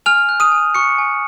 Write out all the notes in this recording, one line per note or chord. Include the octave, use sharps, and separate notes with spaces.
G#5 F6 F7
F#6
D#6 D#7
G#5
C#6 F#6 C#7
G#5